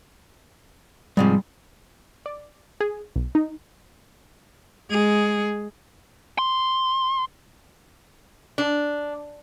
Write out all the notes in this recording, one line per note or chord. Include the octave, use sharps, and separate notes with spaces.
G#2 C3 F3 G3
D5
G#4
B1
D#4
G#3 G#4
C6
D4